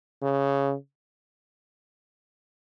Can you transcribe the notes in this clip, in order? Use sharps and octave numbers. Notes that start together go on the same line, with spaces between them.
C#3